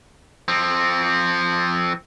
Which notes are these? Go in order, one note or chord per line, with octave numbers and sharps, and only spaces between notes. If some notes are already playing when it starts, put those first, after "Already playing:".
F3 C4